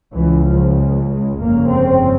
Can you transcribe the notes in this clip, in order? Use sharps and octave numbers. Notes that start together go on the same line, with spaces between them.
C#2 C#3 E3
F3
G#3
G#3
G1 F2 C#3 A#3
C4